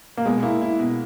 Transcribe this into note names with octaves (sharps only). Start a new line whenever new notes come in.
A#3
B2 G#3
A#3 E4
E4
B2